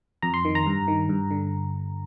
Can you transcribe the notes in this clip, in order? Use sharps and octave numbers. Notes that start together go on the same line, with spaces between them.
F2 A#5
C6
D#3
A#5
G2
D#3
G2
D3